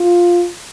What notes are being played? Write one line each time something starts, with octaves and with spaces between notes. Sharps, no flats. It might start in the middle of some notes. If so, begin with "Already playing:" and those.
Already playing: F4